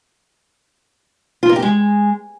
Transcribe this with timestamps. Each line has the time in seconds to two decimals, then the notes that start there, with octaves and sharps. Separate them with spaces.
1.43 F4
1.49 A#4
1.56 G4
1.62 G#3